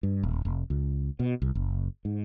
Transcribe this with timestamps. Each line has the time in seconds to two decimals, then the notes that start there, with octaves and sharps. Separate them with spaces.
0.03 G2
0.23 D#1
0.45 F1
0.70 C#2
1.19 B2
1.42 C2
1.55 F#1
2.05 G#2